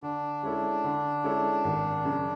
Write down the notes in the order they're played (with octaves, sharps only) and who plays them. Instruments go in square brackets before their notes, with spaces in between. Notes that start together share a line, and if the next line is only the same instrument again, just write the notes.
[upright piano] D3 [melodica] D4
[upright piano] G#3 C#4 E4 A4
D3
G#3 C#4 E4 A4
G#1
F#2 C#3